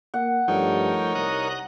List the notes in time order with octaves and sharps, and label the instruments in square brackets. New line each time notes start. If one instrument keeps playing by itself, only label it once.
[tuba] A#3 [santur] F#5
[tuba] G2 [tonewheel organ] F3 A3 G5 [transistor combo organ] D#4 A#4 C#5
[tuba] C2 [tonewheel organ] A#5 D#6 F#6